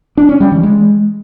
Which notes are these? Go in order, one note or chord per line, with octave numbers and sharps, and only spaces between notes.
D4
C#4
G3
E3
G#3